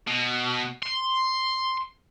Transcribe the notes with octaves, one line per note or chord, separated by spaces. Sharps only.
B2
C6